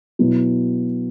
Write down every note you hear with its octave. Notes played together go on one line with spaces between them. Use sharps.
B2 F#3 B3 E4